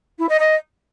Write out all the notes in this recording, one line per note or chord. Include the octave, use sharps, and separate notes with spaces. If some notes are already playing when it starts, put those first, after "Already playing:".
E4
D#5
D#5